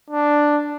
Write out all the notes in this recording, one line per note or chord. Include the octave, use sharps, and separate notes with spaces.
D4